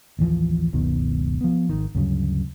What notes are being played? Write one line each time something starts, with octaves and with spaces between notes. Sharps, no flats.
A1 D#2 E3 F3
F#1 C#2 B2 D#3
F3 B3
G#1 D#3
D2 G2 C#3 F#3